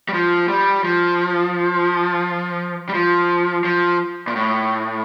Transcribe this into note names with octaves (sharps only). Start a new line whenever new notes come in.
G3
F3
G3
F3
G3
F3
F3
A#2
A2